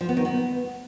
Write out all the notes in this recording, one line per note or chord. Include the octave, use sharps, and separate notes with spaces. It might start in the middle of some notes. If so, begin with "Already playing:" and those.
F3
B3
D#3
B3